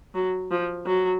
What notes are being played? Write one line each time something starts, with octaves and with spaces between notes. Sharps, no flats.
F#3
F3
F#3